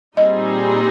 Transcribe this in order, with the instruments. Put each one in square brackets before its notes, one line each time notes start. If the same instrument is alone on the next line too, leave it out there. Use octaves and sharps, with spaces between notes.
[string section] A#2 G3 C4 D#4 G#4 [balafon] D#5